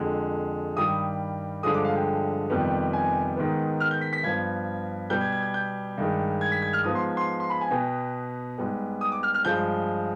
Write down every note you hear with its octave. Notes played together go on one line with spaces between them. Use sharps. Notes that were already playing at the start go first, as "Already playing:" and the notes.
Already playing: F2 D3 G#3
G2 D#3 G3 D#6
G2 D3 F3 G#3 D#6
D6
F5
G5
F2 C3 D#3 G3 B3
G#5
G#2 D#3 B3
F6
G6
B6
B6
G2 F3 B3 G#6
B2 G3 B3 G6
G#6
G#6
G#6
G6
G2 D#3 G#3
G#6
B6
G#6
F6
G#2 F3 B3 D#6
C6
C6
C6
B5
G#5
B2 B3 G5
G#2 G3 B3
D#6
D6
F6
F6
G2 F3 G#3 G6